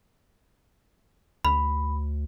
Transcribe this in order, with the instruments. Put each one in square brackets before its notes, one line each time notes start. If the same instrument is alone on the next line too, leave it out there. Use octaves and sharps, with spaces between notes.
[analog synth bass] D2 [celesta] B5